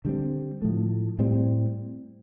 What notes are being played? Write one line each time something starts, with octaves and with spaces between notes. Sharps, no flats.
D3 G3 C4
A2 F3 A3
A2 G3 C4